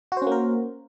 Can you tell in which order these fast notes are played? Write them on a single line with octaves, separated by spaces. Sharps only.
F#4 C5 C#4 A#3 A#4